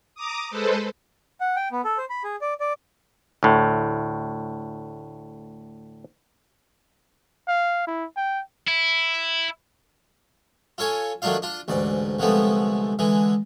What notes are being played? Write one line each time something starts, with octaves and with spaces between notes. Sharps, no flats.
A#5 D6 D#6
G#3 A4 B4 C5
F#5
G5
B3
A4
C5
B5
G#4
D5
D5
D2 A2
F5
E4
G5
E4
F4 A4 C#5 G#5
D#3 F#3 A3 D4 F4 F5
D4 F4
A1 D2 G#2 D5
C2 D3 F3 G#3 A3 B3
D3 E3 G#3